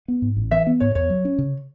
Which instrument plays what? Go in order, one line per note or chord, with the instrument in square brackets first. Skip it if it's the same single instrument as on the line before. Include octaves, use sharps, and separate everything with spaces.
[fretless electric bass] B3
G#2
A1
[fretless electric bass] E3 [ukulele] E5
[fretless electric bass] B3
[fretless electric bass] G#2 [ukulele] C#5
[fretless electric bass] E2 [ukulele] C#5
[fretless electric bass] F#3
C#4
C#3